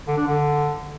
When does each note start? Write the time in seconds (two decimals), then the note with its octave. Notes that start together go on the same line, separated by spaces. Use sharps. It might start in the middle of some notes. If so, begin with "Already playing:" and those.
0.08 D3
0.17 D4
0.27 D3